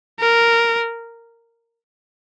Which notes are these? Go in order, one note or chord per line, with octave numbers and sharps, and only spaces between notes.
A#4